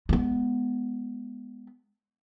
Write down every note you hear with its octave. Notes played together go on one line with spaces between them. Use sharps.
G#3 B3